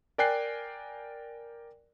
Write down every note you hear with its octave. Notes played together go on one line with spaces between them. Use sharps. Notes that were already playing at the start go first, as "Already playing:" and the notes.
A#4 D5 G5 G#5 F#6 C7